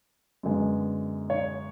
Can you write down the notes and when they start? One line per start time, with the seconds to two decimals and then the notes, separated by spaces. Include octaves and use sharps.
0.43 F#2 D3 G#3 B3
1.30 C#5